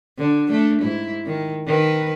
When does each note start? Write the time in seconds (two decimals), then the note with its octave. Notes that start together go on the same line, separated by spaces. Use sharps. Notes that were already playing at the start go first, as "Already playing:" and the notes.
0.18 D3
0.50 A3 D4
0.82 G#2 E4
1.26 D#3
1.67 D#3 B4